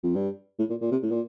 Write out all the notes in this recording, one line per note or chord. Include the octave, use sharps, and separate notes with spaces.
F2
G2
A2
A#2
A#2
C3
A2
A#2